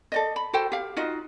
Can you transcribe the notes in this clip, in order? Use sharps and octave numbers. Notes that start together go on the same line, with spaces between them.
A4 D5 D#5
B5
F#4 A4 C5 G5
G4 F5
D#4 F4 F#4 D#5